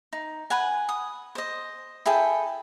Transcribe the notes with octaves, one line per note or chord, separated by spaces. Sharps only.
D#4
B4 F#5 G#5
D#6
C5 D#5
E4 G#4 A4 G5